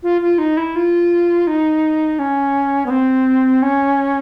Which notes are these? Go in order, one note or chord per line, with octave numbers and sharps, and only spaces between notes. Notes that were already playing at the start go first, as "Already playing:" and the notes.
F4
F4
D#4
E4
F4
D#4
C#4
B3
C4
C#4